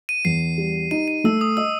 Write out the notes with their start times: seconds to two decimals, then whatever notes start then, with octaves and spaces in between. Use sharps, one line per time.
0.09 D#7
0.25 E2 C7
0.58 G3
0.91 D#4 D#7
1.08 D#7
1.24 A3 E6
1.41 D#6
1.57 D#5 E6